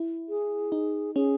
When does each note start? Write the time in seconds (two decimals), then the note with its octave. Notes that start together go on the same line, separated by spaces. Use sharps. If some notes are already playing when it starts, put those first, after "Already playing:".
Already playing: E4
0.29 G#4
0.72 D#4
1.15 C#4 G#4